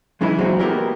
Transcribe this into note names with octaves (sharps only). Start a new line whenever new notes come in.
F#2 C#3 E3 G#3 D#4 E4
E2 A#2 F#3 G#3 C4 F#4
A#3 B3 E4 G4 A#4